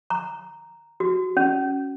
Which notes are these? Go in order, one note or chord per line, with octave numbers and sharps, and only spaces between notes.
A#5
F#4
C#4